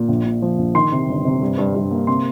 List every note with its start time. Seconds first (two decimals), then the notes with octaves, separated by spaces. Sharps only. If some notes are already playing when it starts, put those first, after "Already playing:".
Already playing: A#2
0.09 A#1
0.25 A#2
0.42 F3
0.58 A#1
0.74 D#3 C6
0.92 C3
1.09 G1
1.25 C3
1.42 G2
1.58 G2
1.75 G2
1.91 A#3
2.07 C3 C6